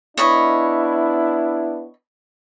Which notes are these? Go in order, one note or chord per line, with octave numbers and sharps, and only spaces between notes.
B3 D4 E4 C#5 D#5 B5